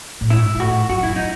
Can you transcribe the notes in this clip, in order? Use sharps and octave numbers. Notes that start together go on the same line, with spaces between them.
A2
G#2 E4
G#2
A2 F#4
F#2 F#4
E4
F#2
D#4